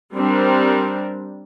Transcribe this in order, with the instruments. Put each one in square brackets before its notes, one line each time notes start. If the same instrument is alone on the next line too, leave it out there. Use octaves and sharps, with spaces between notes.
[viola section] G3 C4 D4 A#4